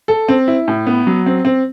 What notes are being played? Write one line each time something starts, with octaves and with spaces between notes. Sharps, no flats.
A4
C4
E4
A2
B3
F#3
C4
C4